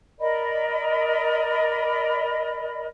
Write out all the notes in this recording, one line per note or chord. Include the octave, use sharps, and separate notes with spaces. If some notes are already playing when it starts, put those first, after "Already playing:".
A#4 D5 D#5 B5